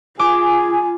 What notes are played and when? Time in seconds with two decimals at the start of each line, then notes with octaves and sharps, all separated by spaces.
0.19 F4 G#4 G#5 D6